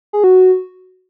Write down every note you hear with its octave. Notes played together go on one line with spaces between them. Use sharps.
G#4
F#4